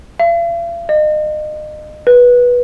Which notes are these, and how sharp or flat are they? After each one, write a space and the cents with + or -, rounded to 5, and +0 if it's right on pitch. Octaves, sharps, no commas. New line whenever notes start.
F5 -45
D#5 -35
B4 -15